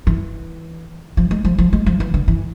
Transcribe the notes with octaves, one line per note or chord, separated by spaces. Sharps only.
E3
F3
G#3
F3
F3
G#3
F3
E3
D3
E3